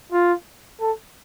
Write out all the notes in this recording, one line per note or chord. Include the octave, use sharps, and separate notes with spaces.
F4
A4